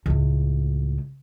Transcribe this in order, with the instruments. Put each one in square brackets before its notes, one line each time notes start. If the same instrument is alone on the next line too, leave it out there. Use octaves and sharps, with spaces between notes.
[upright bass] C#2 A2